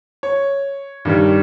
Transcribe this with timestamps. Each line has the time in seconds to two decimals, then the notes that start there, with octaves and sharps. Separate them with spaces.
0.23 C#5
1.05 G2 D#3 G3